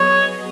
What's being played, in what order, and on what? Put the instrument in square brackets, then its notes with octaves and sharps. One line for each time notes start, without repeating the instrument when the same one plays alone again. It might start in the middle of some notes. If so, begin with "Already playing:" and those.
Already playing: [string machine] F#3 B3 G#4 D#5 [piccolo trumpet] C#5